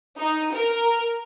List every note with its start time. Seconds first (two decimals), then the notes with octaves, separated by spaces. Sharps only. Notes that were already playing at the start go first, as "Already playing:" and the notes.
0.18 D#4
0.53 A#4